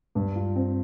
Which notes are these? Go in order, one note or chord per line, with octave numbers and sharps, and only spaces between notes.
G2
F4
C4